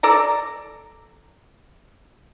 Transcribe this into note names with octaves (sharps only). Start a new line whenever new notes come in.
A4 D5 A#5